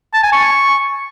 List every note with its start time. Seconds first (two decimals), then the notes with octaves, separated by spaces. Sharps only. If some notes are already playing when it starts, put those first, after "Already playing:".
0.14 A5
0.23 G#5
0.33 C#6